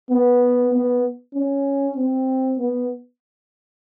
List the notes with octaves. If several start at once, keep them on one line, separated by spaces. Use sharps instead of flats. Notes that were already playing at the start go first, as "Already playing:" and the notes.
B3
B3
C#4
C4
B3